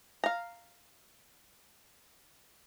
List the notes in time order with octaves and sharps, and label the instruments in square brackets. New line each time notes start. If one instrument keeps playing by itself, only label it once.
[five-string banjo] F5 A#5